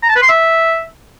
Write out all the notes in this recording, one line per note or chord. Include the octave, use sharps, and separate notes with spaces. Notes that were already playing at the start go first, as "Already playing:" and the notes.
A#5
A5
B4
C6
E5